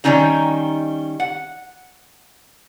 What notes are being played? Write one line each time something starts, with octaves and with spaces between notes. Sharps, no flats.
D#3 G3 A3 C#4 D#4 A#5
F#5